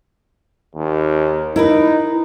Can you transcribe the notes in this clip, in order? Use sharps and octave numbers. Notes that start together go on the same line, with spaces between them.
D#2
D#4 E4 A#4 B4